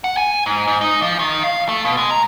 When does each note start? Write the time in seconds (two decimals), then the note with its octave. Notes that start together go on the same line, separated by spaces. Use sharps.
0.04 F#5
0.17 G#5
0.46 G#2
0.67 G#2
0.81 D#4
1.02 F3
1.19 D#3
1.43 F5
1.69 A3
1.85 B2
1.97 G#3
2.11 A#5